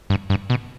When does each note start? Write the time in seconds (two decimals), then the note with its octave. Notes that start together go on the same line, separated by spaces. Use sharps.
0.10 G2
0.30 G2
0.50 B2